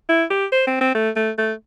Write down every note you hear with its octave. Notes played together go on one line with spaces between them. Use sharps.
E4
G4
C5
C4
C4
A3
A3
A3